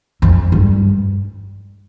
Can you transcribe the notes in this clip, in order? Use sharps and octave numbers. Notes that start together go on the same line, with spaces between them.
F2
G2